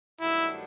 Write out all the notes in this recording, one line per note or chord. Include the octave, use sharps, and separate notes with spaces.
G2 D#3 F#3 A3 D4 E4